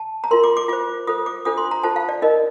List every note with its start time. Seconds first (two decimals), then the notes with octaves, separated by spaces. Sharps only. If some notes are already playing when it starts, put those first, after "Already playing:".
Already playing: A5
0.24 A#5
0.31 F4 A#4 C6
0.44 D6
0.57 D6
0.68 F4 C5 D6
1.07 F4 A4 C5 D#6
1.26 D6
1.45 D4 F4 A4 C5 D#6
1.58 C6
1.71 A#5
1.84 F4 A4 C5 A5
1.96 F5
2.09 D5
2.22 D#4 A#4 D#5